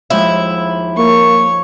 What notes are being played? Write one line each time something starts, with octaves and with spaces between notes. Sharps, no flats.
D#2 F3 G#3 E4
A#3 C#5 C#6